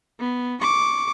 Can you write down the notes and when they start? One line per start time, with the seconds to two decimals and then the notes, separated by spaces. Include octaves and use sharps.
0.20 B3
0.61 C#6 D6